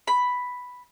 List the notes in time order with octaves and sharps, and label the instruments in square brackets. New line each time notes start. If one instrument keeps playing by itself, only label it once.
[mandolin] B5